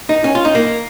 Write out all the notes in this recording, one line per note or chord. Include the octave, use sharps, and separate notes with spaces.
D#4
C#4
F4
D#4
A#3